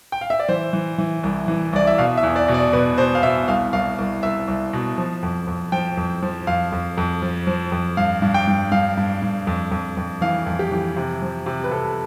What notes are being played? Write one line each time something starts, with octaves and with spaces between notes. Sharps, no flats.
G5
F5
E5
D5
E3 C5
E3
E3
C2
E3
C2 D5
E5
B2 F5
E5
E2
D5
B2
D5
B2 B4
B2 C5
F5
B2 E5
C2 F5
C2 F5
C2
C2 E5
C2
B2
F3
F2
F2
F3 G5
F2
F3
F2 F5
F2
F2
F3
F3
F2
G2 F5
G2
G5
G2
G2 F5
G2
G2
F2
F2
F2
E3 F5
F2
G4
E3
C3
F3
C3
B4
C3 A4